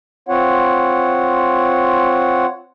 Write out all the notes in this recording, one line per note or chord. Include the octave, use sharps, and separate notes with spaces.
C4 F4 C#5 F#5